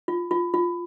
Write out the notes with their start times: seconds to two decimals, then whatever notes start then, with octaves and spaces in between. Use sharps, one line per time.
0.08 F4
0.31 F4
0.54 F4